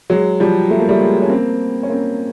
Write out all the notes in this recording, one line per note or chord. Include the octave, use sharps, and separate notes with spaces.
F#3 G#3
F3 G3
A3
A#3
G3 A3
G#3 A#3
C#4
A#3 C4
C#4
A#3 C4